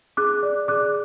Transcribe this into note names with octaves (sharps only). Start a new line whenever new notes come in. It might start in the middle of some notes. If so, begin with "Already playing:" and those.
G#4 D6 F#6
D5
G#4 D6 F#6